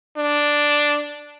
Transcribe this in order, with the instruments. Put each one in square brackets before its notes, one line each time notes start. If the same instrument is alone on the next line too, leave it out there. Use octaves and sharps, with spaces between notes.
[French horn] D4